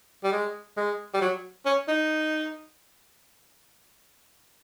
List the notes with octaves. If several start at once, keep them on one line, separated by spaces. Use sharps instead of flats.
G3
G#3
G#3
G3
F#3
C#4
D#4